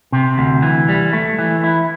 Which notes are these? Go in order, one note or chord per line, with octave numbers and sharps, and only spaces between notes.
C3
D2
E3
G3
A3
E3
E4